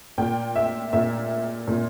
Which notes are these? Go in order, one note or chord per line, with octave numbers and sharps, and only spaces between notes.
A#2 G5
E5
A#2 E5
A#2